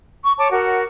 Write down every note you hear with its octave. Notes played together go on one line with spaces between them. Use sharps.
C#6
C#5 A5 D6
F#4 A#4 F#5